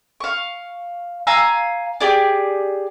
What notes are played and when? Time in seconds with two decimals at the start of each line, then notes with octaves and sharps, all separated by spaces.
0.20 F5 C#6
1.27 F5 G#5 A#5 E6
2.00 G4 G#4 D5